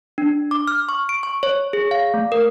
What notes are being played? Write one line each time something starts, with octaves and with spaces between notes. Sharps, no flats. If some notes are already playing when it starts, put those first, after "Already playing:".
D4
D6
F6
C#6
D7
C#6
C#5
G#4
F5
A3
A#4